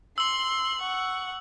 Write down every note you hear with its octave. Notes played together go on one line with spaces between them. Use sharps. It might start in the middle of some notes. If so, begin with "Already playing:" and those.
C6 E6 F#7
F#5 C#6